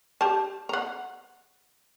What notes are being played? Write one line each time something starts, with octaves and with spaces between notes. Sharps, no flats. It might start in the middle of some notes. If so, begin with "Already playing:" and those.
G4 A5
F#5 A#5